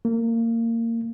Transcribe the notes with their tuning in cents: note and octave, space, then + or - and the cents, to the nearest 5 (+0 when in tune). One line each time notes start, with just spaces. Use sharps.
A#3 -25